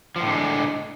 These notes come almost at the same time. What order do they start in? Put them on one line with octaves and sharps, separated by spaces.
F3 A2 D3 G#3